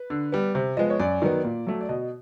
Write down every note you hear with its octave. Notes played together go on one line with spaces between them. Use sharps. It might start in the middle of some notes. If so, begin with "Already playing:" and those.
Already playing: B4
D3
G3 B3
C3
F3 G#3 B3 D#5
C#5
F#2 D5
D#3 F#3 B3
A#2
F#3 A3
D5
B2 D#5